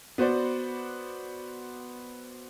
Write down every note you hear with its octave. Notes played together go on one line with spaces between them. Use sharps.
B3 F#4 C5 D5